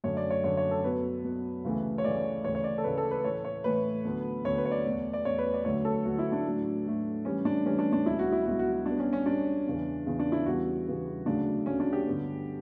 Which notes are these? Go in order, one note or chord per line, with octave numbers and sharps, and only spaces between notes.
F#2 D3 A3 C#5
D5
C#5
F#2 D3 A3 C#5
C#5
A4
B2 F#3 B3 B4
B2 F#3 B3
D2 C#3 E3 A3
C#5
D2 C#3 E3 A3 D5
D2 C#3 E3 C#5
C#5
D5
A4
D2 C#3 E3 B4
A4
B4
A2 E3 A3 C#5
C#5
A2 E3 A3 B4
D2 D3 F#3 B3
D2 D3 F#3 B3 C#5
B4
C#5
D5
E2 B2 A3
D5
E2 B2 A3 C#5
B4
D5
D2 D3 F#3 A3 C#5
A4
D2 D3 F#3 A3 F#4
E4
D4
A2 F#3 A3
A2 F#3 A3
A2 E3 G3 C#4
D4
A2 E3 G3 C#4
D4
D4
C#2 B2 F#3 B3 E4
F#4
E4
C#2 B2 F#3 B3 F#4
F#4
F#4
B2 G3 B3 D4
C#4
C#4
B2 G3 B3 D4
E2 C#3 E3
E2 C#3 E3
D4
E4
E2 C#3 E3 G3 B3 F#4
E2 C#3 E3 G3 B3
D2 C#3 F#3 A3 D4
D2 C#3 F#3 A3 C#4
D4
G4
G2 D3 G3 B3